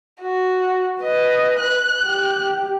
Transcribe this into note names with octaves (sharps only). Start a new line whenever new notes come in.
F#4
B4 D#5
F#6
G4